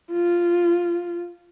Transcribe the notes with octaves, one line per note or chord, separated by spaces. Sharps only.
F4